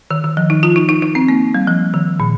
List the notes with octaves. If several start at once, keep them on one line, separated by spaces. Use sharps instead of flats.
D#3
D#3
F3
D#4
F4
D#4
D#4
D#4
C4
A#3
G3
F3
D#3
A#2